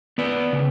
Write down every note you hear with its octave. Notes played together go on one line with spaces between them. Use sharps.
B3 B4 D5
C#3